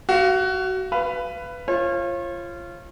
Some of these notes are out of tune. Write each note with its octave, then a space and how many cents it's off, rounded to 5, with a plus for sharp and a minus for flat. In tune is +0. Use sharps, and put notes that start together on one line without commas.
F#4 +20 F5 -15
B4 +10 F5 -30
F4 -20 C#5 -40